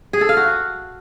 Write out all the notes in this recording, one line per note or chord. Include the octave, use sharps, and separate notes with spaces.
G#4
A4
F5
F#4